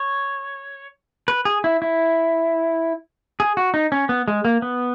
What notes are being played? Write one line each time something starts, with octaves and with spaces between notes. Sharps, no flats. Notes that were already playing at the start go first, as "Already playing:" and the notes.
Already playing: C#5
B4
G#4
E4
E4
G#4
F#4
D#4
C#4
B3
G#3
A#3
B3